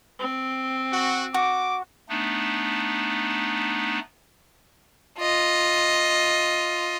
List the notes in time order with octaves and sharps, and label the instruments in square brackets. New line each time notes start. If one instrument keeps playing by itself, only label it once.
[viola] C4
[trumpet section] F#4
[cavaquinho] F#4 [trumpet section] D6
[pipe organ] A3 B3 D4 D#4
[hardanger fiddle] F4 D#5